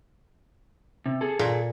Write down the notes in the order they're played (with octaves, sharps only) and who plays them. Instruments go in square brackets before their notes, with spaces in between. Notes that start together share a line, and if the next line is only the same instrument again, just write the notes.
[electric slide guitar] C3
G#4 A4
[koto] A#2